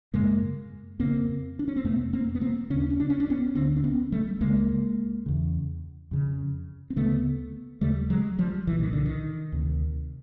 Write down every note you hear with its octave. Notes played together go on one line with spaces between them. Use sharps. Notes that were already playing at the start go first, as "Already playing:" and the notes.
F#2 C#3 G#3 A#3
F2 C#3 A#3 C4
D4
C#4
C4
F2 C3 A3 B3
A#3 C4
B3
A#3 C4
D#2 C#3 C#4
D4
C#4
D4
C#4
D4
B3 C#4
D2 D3 C4 D4
D4
B3 C#4
G3 A3
C#2 C#3 G#3 A#3
E2 C#3
F2 C#3
C4
D2 C#3 A3 B3
D#2 C#3 G3 A3
F#3 G#3
F3 G3
C2 A#2 E3
D#3
D3
D#3
D2 C3